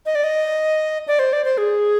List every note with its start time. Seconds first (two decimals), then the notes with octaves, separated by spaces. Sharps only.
0.06 D#5
0.15 D5
0.24 D#5
1.08 D5
1.19 C5
1.33 D5
1.45 C5
1.58 G#4